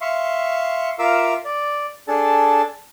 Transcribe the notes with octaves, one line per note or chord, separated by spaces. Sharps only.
E5 F5 C6 C#6
F4 A#4 E5 F5 D6 E6
D5
D4 G#4 A4 A5